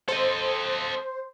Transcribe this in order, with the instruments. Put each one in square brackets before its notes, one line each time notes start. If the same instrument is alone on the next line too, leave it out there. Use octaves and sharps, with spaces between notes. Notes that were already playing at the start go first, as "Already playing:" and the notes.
[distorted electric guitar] A4 D#5 [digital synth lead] C5